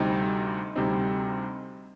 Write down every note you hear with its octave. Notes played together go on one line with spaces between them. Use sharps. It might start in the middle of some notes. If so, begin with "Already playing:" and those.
Already playing: D2 C3 G3 C4 D#4
D2 C3 G3 C4 D#4